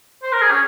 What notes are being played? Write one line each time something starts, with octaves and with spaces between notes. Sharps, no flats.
C5
A#4
G#4
C#4